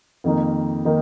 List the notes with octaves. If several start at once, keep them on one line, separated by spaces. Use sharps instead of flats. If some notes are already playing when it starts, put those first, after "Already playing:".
F2 D#3 A#3 D#4
D#3 A#3 D#4